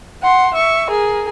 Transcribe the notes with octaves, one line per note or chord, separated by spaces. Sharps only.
F#5 C6
E5 C#6
G#4 A#4